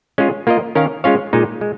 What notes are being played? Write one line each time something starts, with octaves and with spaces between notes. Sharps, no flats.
G#3 C#4 F4 G#4
A#3 F4 A#4 D#5
D#3 C#4 A#4 F5
G#3 C#4 F4 C#5 F5
A#2 G#3 D#4
G#3